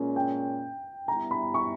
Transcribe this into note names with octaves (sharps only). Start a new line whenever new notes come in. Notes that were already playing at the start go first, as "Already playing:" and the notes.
Already playing: A#2 G#3 C#4
G5
G3 B3 E4 A#5
B5
C#6